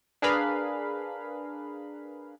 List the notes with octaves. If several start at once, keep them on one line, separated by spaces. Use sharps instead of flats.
D4 G#4 A#4 B4 F5 B5